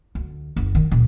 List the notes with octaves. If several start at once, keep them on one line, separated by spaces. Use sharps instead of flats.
D2
F#1 E2
D#3
C#2 A#2